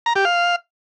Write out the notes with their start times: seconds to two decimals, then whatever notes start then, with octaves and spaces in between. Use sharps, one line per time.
0.06 A#5
0.16 G4
0.25 F5